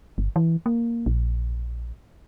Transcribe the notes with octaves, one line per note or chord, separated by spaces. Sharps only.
G1
E3
A#3
A#1